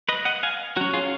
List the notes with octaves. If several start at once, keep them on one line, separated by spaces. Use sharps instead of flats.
B4 D#5
D#5 F#5
F5 G#5
F#3 C#4 F#4
F4 G#4